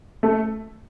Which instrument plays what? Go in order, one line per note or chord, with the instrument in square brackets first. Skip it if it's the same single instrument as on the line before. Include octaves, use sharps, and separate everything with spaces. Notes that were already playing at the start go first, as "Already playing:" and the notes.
[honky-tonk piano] A3